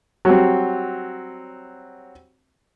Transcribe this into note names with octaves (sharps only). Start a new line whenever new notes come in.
F#3 G3 C4